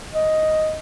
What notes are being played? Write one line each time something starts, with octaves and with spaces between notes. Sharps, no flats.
D#5